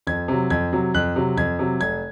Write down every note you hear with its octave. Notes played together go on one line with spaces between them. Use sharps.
F2 G#6
C3 F#3
F2 G#6
C3 F#3
F2 F#6
C3 F#3
F2 G#6
C3 F#3
F1 G#6